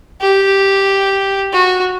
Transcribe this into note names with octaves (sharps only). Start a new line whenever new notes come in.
G4
F#4